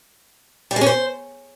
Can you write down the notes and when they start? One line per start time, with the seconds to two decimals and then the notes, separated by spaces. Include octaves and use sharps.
0.71 G3
0.76 G#3
0.81 C#4
0.86 C5